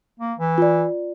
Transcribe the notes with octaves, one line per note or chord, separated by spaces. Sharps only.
A#3
E3
F4 D5